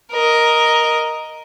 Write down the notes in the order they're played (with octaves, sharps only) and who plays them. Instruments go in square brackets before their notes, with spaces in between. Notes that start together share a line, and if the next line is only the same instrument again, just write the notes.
[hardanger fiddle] A#4 D#5